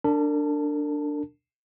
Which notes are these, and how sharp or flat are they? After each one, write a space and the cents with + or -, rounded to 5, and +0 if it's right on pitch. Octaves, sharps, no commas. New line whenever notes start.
D4 +0 A#4 -40 A5 +0